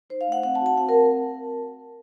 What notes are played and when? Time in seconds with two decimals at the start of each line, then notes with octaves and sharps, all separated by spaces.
0.10 D#4 C5
0.21 F5
0.27 A3 F#5
0.43 C4 F#5
0.55 A5
0.61 F#4
0.66 A5
0.77 C4 F#5
0.89 A#4
0.95 C4